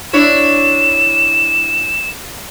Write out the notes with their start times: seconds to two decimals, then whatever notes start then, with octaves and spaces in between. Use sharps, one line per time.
0.13 D4 E4 C#5 E7